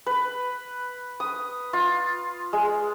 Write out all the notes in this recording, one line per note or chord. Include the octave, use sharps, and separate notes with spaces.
B4
D#6
F4
G#3